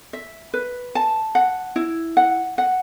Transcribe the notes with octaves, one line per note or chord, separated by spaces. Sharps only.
E5
B4
A5
F#5
E4
F#5
F#5